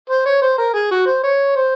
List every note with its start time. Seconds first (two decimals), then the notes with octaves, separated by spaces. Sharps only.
0.10 C5
0.26 C#5
0.42 C5
0.58 A#4
0.74 G#4
0.91 F#4
1.06 C5
1.23 C#5
1.56 C5